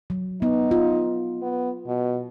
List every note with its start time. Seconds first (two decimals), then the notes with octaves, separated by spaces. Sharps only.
0.10 F#3
0.42 B3 D#4
0.71 F4
1.42 B3
1.87 B2